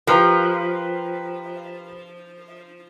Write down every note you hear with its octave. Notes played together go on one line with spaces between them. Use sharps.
F3 G4 A#4 B4